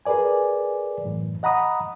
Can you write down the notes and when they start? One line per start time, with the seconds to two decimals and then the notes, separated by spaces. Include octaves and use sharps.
0.05 G#4 A#4 B4 D5 G#5
1.04 F#2 A2 E3
1.43 D#5 F#5 A#5 B5 D#6